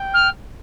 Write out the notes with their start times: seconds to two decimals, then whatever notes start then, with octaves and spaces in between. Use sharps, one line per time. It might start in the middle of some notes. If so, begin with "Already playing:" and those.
Already playing: G5
0.14 F6